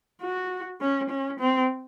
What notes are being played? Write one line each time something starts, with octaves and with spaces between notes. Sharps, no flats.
F#4
C#4
C#4
C4